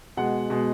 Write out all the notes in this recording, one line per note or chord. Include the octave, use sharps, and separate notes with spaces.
B2 G#3 F#5
B2 G#3